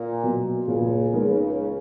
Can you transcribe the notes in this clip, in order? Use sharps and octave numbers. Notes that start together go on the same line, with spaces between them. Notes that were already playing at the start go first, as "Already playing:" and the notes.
Already playing: A#2
B2 F#3
C#2 A#2 C#3
G#3 B3 D#4 A#4